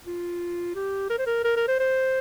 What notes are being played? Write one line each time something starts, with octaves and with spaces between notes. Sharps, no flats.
F4
G4
A#4
C5
A#4
A#4
A#4
C5
C5